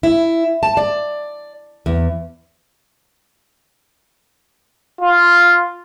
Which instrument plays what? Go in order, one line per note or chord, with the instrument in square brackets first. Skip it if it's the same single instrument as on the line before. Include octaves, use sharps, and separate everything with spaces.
[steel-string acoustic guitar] E4
A5
D5
E2
[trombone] F4